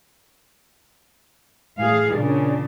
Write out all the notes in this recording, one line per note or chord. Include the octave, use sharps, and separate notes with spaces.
A2 G#4 F5
A#2 C#3 D4